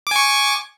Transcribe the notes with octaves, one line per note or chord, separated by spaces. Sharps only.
G#5 C#6 D6